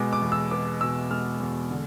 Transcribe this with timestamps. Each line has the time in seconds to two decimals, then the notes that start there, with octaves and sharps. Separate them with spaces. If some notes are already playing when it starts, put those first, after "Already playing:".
Already playing: B2 G#3 B3 D6
0.13 D6
0.22 E2
0.32 E6
0.51 B3 D6
0.81 B2 E6
1.11 G#3 F6
1.40 E2
1.70 D3